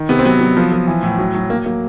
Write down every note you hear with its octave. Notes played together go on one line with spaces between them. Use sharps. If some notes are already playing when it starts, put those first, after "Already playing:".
Already playing: D#3
C3 B3
C4
F#3 B3
F#3
F3
F3
E3
A2
F#3
F#3
F#3 A#3
F#3 A#3